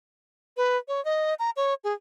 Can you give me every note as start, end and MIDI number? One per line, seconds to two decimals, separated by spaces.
0.57 0.77 71
0.88 1.03 73
1.05 1.34 75
1.39 1.50 82
1.56 1.74 73
1.84 1.93 68